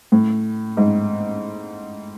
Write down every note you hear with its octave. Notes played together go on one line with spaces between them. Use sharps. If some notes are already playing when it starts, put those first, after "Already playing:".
A2
G#2